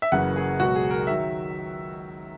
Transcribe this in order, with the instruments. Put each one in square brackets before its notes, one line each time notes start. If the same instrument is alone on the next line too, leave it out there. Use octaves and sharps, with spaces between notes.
[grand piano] E5
F#1 F#2 C#3 E3 F#5
G#4
C#2 B2 F#3 F#4
G#4
A#4
D#3 F#3 E5